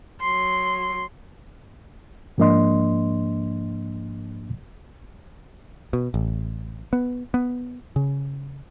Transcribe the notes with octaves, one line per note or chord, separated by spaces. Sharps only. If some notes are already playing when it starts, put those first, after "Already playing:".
F#3 C6
G#2 F3 A#3 D4 D#5 C6
B2
A1
B3
B3
C#3